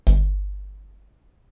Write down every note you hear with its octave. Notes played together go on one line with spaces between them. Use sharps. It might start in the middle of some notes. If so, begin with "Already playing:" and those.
G1